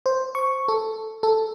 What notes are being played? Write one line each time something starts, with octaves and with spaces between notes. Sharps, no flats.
C5
C#6
A4
A4